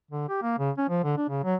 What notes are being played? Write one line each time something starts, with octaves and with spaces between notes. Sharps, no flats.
D3
G4
A#3
C#3
C#4
F3
D3
D4
C#3
F#3